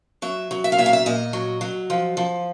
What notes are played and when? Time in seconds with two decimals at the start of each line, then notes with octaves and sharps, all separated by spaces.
0.22 F#3 E5
0.51 F#3
0.64 E5
0.72 F5
0.78 A#2 E5
0.86 F5
0.93 E5
1.06 A#2 D#5
1.33 F#3
1.61 F#3
1.90 F3
2.17 F3